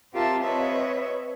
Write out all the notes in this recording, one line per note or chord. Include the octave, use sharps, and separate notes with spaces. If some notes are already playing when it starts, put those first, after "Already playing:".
C4 F4 G4 A#4 E5 A5
C4 B4 C#5 D#5 E5